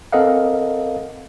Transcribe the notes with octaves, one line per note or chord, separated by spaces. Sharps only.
C4 A4 A#4 D#5 F5 F#5